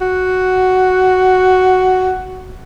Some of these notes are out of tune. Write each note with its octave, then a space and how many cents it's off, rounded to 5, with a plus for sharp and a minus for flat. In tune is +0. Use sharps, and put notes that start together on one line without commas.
F#4 +5